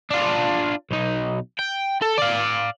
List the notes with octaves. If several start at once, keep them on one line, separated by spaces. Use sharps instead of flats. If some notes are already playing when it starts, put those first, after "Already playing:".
D4 F4
B1 D#4
G5
A4
D5 F5